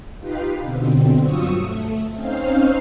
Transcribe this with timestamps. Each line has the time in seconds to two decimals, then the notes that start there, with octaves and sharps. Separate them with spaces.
0.18 D#4 F4 G4 B4 F5
0.60 B2 D3 C4
1.18 G2 F#3 F4 C#6 D#6 E6
1.55 A3
2.11 C4 C#4 D#4 C5 F5